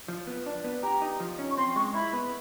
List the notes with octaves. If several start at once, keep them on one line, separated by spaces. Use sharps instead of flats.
F3
B3
D4
B3
G4 A#5
D#4
F3
C#4
C#6
C4 C6
G#3 C#6
E4 B5
B3